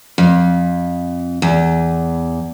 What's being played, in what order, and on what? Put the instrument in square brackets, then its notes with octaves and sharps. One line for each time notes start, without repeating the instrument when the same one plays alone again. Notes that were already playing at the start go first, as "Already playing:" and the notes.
[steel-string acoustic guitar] F2
E2